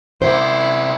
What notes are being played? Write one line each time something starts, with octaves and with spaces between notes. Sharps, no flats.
C3 E4 A#4 C5